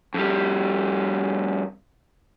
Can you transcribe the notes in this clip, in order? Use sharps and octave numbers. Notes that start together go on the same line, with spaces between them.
F2 G3